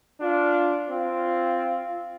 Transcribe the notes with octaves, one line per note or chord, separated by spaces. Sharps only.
D4 F4
C4 F4